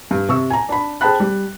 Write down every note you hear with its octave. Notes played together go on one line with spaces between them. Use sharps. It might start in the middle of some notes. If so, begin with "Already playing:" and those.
G2
C3 C#6 E6
G#5 A#5
D4 B5
G#4 C5 G5 A5 B5 F#6
G3